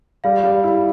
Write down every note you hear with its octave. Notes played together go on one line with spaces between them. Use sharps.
G3 F5
G3
E4